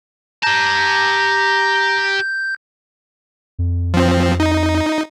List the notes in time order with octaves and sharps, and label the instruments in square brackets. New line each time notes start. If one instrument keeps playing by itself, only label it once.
[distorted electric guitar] G4 A5 [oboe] A#5 [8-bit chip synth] G6
[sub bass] F2
[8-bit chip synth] F3 C4
D#4